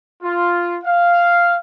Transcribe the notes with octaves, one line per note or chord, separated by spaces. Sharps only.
F4
F5